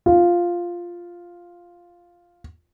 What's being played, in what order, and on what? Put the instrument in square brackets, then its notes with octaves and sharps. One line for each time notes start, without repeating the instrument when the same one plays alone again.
[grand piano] F4